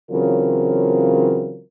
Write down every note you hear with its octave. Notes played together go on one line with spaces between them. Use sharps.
C#3 E3 F#3 C4 F4 A#4